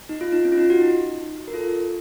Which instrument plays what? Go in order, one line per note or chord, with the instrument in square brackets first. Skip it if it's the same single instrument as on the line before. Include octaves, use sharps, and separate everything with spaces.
[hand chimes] D#4
F4
D#4
C#4
F4
D#4
F#4
D#4
A#4
F4 A4